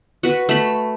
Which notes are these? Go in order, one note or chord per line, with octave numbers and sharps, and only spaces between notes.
F#4 B4
A3 B5